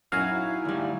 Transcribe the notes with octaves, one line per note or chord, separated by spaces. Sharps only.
F#2 F#3 D#4 E4 F#4 F5 G#5
D2 G3